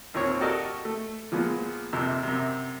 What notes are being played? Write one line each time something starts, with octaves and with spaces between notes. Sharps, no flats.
D#2 A#2 C4 C#5
F#4 G4 A4 A#4 D5 D#5
A3
A#2 F3 G#3 B3
A#1 F2 C3 E6
F#2 C3